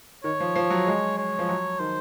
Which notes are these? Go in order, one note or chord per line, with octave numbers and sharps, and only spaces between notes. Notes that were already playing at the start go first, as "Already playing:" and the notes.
D#3 C#5
F3
F3
F#3
G#3
C#5
F3
F#3
D#3 C5